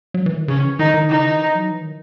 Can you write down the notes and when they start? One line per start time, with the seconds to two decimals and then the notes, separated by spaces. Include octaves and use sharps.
0.14 F#3
0.26 E3
0.37 D#3
0.48 C#3 C#4
0.64 E3
0.79 D#3 D#4
0.94 D#3
1.09 C#3 D#4
1.25 D#3
1.39 E3
1.55 F#3
1.70 E3
1.81 D#3